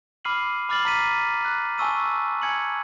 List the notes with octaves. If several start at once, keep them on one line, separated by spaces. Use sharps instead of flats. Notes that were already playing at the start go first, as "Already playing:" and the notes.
B5 D6 F6 C7 D#7 F#7
B5 D6 F6 A6 C7 F#7
A#5 F6 B6 C7 D#7
F#6
G#5 A5 C#6 E6 D#7
G#5 G#6 C#7 F#7